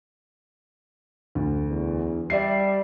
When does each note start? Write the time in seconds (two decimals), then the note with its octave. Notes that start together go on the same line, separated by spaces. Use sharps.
1.35 D2
1.69 E2
2.30 G3 D5 E5 C7